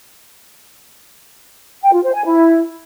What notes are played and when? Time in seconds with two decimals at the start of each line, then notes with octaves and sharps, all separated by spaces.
1.82 G5
1.93 F4
2.03 C5
2.14 G#5
2.25 E4